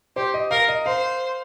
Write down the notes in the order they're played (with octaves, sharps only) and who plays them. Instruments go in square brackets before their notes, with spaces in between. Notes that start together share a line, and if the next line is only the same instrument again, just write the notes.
[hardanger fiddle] G4 [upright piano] C5
[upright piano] D#5
[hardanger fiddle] A#4 [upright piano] F5
[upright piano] D#5
[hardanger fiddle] C5 [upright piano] F5